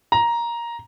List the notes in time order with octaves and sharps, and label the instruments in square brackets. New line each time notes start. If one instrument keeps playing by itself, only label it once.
[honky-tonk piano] A#5